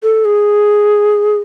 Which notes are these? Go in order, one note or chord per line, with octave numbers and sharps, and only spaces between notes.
A4
G#4